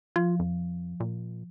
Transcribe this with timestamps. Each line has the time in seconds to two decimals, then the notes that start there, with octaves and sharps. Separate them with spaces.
0.16 F3 F4
0.39 F2
1.00 A#2